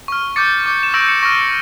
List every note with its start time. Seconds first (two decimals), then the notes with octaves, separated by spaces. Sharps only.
0.08 C#6 F6
0.36 D6 G6 A6 C#7
0.66 D6 G6
0.83 E7
0.94 C#6 E6 G6 A#6 D7
1.08 C#7 E7
1.22 C#6 F6 A#6